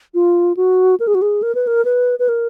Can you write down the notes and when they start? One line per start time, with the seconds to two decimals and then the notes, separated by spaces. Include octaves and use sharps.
0.14 F4
0.57 F#4
1.00 A#4
1.07 G#4
1.15 F#4
1.22 G#4
1.42 A#4
1.55 B4
1.67 A#4
1.85 B4
2.19 B4
2.29 A#4